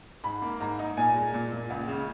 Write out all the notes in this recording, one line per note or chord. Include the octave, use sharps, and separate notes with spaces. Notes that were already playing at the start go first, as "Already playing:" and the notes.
G#2 B5
A#3
G#2 A#5
D#4
A#2 G#5
G#3
A#2
A#2
C#2
C#3